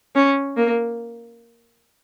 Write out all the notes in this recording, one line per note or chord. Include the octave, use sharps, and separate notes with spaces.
C#4
A#3